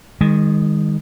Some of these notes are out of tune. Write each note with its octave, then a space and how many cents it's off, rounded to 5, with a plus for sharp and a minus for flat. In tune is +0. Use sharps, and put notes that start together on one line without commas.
D#3 +0 G#3 -35